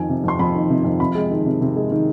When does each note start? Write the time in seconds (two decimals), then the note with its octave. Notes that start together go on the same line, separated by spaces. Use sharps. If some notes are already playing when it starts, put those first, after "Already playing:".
Already playing: F2 D#3 G#5
0.09 C3
0.24 F2 C6
0.39 F2 B5
0.55 D#3
0.70 C3
0.84 F2
1.00 C3 B5
1.15 G#3
1.30 D#3
1.46 C3
1.61 C3
1.76 G#3
1.91 D#3